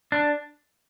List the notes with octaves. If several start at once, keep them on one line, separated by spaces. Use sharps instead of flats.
D4